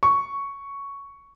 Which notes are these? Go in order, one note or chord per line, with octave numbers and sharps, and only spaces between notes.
C#6